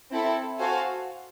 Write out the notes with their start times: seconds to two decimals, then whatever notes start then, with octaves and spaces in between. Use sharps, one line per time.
0.11 C4 E4 A4
0.58 F#4 A4 C5 F5 G#5